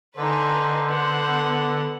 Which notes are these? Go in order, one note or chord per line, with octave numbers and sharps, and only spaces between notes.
D3 D#4 A4 B4 C5 G#5
B3 A4 F#5